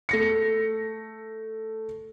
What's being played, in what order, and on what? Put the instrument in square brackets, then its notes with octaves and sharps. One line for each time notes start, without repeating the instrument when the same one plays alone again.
[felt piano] A3 A#6 C#7